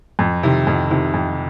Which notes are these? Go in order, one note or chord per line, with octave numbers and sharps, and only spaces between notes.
F2
C3 D#3
F2
C3 D#3
F2